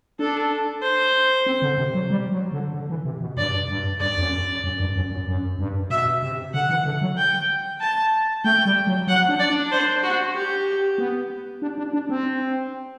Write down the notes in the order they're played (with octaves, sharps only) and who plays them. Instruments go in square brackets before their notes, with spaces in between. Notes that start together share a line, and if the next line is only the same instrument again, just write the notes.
[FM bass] D4 [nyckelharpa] A4
[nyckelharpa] C5
[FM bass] C4
D3
C3
F#3
G3
F#3
D3
D3
E3
C3
B2
[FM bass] G2 [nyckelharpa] D5
[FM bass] G2
[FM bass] G2 [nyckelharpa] D5
[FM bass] E2
F#2
F#2
G2
F#2
F#2
F#2
G2
[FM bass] B2 [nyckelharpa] E5
[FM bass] C3
[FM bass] D3 [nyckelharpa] F#5
[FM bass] E3
D3
F#3
[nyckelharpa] G5
A5
[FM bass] A3 [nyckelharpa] G5
[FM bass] G3
F#3
[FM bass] F#3 [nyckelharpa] F#5
[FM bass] D4
[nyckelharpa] D5
[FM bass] D4
[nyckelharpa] C5
F#4
G4
[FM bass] B3
D4
D4
D4
C4